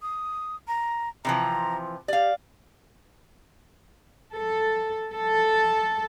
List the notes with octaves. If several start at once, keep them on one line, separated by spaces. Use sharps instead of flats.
D#6
A#5
C3 E3 F3 A#5
G4 D5 F5
A4
A4